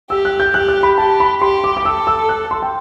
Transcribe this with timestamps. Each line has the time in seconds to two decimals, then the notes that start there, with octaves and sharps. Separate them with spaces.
0.10 G4 E6
0.25 F#6
0.40 G6
0.53 G4 F#6
0.68 F#6
0.83 B5
0.98 G4 A5
1.20 B5
1.41 G4 C6
1.64 D6
1.77 D6
1.85 A4 E6
2.07 E6
2.29 F#6
2.51 C6
2.62 G5